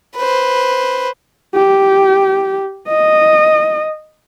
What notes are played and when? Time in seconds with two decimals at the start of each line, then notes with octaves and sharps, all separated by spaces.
0.17 B4 C5
1.55 G4
2.89 D#5